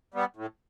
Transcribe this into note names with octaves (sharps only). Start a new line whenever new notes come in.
G3 B3
A2